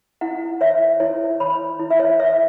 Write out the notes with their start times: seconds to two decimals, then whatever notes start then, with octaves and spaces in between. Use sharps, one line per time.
0.21 E4 F#5
0.61 C#5 E5
1.00 E4 C#5
1.40 C#5 B5
1.79 E4
1.90 E5
2.00 C#5
2.20 C#5 E5